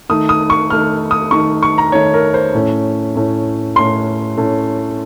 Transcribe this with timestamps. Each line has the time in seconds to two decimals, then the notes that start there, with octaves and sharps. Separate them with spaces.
0.09 D#3 A3 D#4 D#6
0.29 D#6
0.50 C#6
0.70 D#3 A3 D#4 F6
1.11 D#6
1.31 D#3 A3 D#4 C#6
1.63 C#6
1.78 A#5
1.92 D#3 A3 D#4 C#5
2.14 A#4
2.34 C5
2.54 A2 A3 C#4
3.15 A2 A3 C#4
3.76 A2 A3 C#4 C6
4.37 A2 A3 C#4